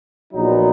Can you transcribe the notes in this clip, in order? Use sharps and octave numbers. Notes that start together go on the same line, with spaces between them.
A#1 A#2 F#3 B3 D#4